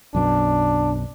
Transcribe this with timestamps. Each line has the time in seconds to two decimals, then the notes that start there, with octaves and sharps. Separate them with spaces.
0.15 B1 F#2 B2 D4